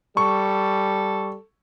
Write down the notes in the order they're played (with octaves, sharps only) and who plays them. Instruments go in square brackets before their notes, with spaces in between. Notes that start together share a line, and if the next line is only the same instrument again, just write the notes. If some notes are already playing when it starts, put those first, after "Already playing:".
[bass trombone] G3 [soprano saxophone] A4 [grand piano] C#6